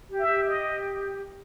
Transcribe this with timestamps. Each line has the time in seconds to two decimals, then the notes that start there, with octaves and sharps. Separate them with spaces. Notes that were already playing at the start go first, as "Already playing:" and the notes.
0.10 G4
0.19 E5
0.28 G4
0.47 D#5